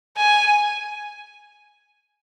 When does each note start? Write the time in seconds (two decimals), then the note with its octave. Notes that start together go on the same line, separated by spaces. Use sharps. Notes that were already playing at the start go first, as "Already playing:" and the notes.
0.17 G#5